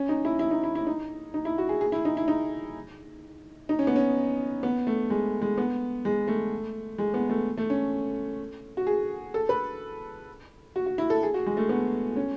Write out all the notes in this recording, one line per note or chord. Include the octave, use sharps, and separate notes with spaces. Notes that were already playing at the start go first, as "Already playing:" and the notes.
Already playing: C#4
D#4
E4
E4
D#4
E4
E4
D#4
D#4
E4
F#4
G#4
G#4
E4
D#4
E4
D#4
D#4
C#4
B3
C#4
B3
A3
G#3
G#3
B3
G#3
A3
G#3
B3
A3
A3
C#4
F#4
G#4
A4
B4
F#4
F#4
E4
A4
G#4
F#4
G#3
A3
B3
C#4